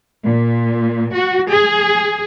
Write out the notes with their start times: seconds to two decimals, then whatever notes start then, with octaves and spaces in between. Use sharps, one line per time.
0.23 A#2
1.13 F#4
1.49 G#4